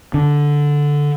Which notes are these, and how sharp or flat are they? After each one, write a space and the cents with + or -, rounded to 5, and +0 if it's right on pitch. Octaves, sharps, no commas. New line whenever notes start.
D3 -5